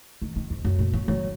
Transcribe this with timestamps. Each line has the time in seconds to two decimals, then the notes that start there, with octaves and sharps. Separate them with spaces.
0.22 D#3
0.36 D#3
0.50 F2
0.65 F#2
0.79 A#2
0.93 F#3
1.08 F#3